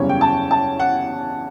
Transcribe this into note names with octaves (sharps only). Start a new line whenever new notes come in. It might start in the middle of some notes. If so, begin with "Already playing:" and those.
Already playing: F#1 E2 C#3 G3 C#5
G5
A5
A5
F#5